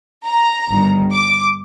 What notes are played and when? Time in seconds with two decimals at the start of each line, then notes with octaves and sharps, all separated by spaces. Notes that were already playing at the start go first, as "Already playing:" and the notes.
0.25 A#5
0.70 G1 G2 D#3
1.12 D6